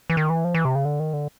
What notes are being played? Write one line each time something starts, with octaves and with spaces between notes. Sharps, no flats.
E3
D#3
E3
F3
E3
C3
C#3
D3
D#3
D3